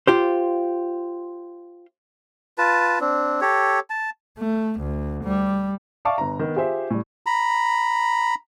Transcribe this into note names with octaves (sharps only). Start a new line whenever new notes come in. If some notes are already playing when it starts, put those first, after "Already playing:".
F4 G4 C5
F4 B4 A5
C4 D4
G4 A4 C#5
A5
A3
D2
G3
D5 E5 F5 A5 C#6 D6
G1 A#5
D#3 B3
F4 G4 G#4 C5 E5
A2 G3
A#5 B5